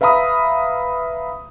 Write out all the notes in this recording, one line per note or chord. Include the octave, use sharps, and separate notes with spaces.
B4 E5 F5 A#5 B5 D#6